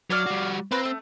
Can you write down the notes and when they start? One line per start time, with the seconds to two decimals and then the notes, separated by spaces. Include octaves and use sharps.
0.10 F#3 C#5 D5 F5
0.26 G3 F#4
0.72 C4 F4 B4 A#5
0.85 A3